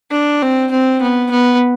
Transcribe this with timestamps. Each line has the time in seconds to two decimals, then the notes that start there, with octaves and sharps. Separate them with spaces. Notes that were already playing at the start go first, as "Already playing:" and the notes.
0.12 D4
0.42 C4
0.71 C4
1.02 B3
1.31 B3